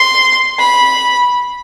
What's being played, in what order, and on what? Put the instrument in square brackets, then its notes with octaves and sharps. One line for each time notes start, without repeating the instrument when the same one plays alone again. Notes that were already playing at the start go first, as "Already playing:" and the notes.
Already playing: [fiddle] C6
B5